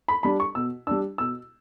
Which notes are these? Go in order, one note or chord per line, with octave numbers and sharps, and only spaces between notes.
B5
G3 D4 B5
C#6
B2 E6
G3 D4 E6
B2 E6